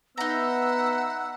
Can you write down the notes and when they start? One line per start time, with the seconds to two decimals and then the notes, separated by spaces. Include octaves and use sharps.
0.18 B3 D#4 E5 F#5 A#5 B5 E6